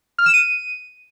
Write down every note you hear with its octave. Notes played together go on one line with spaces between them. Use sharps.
F6
E7
D#7